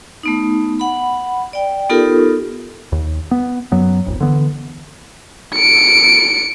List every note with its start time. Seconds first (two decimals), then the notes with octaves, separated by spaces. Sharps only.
0.23 A3 B3 D#4
0.79 F#5 B5
1.53 D5 G5
1.90 B3 D#4 F4 G4 A4 A#4
2.92 D#2
3.31 B3
3.72 F#2 F#3 B3
4.06 D#1 G#1
4.20 D3 E3 B3
5.55 C#7 D7